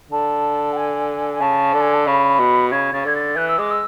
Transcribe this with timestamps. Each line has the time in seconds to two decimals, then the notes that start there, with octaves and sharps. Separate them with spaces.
0.10 D3 A5
0.72 F#5
0.76 G#5
1.32 G#5
1.41 C#3 A5
1.74 D3
1.80 G#5
1.93 A5
2.06 C#3 B5
2.39 B2
2.71 C#3 G#6
2.93 C#3 A6
3.05 D3 G#6
3.15 A6
3.36 E3 F#6
3.47 E6
3.58 G#3 D6
3.70 E6